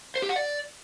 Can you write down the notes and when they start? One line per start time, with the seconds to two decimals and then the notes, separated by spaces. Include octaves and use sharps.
0.16 C5
0.22 G4
0.29 F#5
0.36 D5